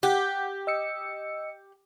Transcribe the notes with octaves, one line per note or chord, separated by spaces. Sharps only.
G4 F#5 G6
D#5 E6 C#7